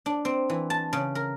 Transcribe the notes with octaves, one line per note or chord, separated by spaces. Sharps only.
D4
C4
E3
A5
C#3
A#4